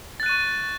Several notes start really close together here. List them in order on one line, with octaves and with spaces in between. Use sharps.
A6 F#6 D#7 C#6